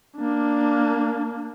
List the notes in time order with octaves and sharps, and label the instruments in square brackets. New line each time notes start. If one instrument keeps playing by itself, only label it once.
[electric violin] A#3 D4